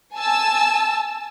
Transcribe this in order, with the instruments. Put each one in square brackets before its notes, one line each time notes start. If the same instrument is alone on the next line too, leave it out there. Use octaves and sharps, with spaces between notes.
[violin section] G#5 A5 E6